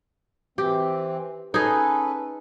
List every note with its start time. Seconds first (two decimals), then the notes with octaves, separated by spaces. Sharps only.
0.58 E3 C4 G4
1.54 C#4 D#4 G#4 A4 B4